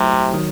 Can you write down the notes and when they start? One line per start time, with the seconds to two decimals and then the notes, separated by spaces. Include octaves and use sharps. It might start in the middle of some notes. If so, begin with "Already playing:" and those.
Already playing: C3 F#3 A3 E4 G4
0.34 D#3 F#3